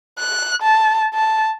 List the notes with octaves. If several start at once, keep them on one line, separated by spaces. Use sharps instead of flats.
F#6
A5
A5